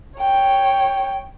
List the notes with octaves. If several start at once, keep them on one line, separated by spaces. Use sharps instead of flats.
C#5 G5